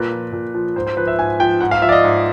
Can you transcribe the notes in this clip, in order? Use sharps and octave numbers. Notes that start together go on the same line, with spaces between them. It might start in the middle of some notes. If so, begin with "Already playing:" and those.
Already playing: A#2 B4
F3
A#2
F3
G#2 C5
C5
F3 B4
E5
G#2 G#5
F3 G5
G#2 F#5
F5
F3 E5
D5
D#5
G#2